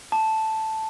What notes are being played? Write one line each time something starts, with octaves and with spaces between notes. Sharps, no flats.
A5